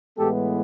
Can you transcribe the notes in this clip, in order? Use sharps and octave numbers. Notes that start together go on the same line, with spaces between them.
A2 E3 G#3 B3 G4 A4